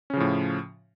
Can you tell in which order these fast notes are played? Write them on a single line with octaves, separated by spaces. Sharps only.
C#4 C#3 F3 A2